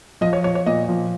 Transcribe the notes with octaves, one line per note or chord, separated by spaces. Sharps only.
F3 D#5
C#5
F3 C#5
C#5
A#2 D#5
F3